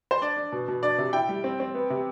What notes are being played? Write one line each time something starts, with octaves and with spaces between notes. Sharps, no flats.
C5
D4 D5
D4
B2
B2
D4 D5
C3
E4 G5
G3
C4
C4
B3
C3